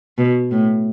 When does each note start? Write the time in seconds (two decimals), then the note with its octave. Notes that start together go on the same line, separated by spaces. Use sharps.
0.18 B2
0.51 A2